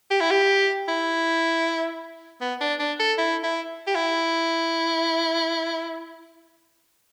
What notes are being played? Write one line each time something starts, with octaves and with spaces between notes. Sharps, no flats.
G4
E4
G4
E4
B3
D4
D4
A4
E4
E4
G4
E4